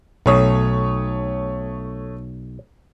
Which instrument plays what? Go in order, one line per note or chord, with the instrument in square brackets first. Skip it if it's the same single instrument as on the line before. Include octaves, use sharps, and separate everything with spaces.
[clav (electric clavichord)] B1 [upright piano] A3 C#5 D#6